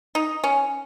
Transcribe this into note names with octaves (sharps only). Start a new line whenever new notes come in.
D#4
C#4